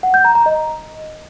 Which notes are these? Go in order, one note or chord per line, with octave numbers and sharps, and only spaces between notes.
F#5
G6
A#5
A#5
D#5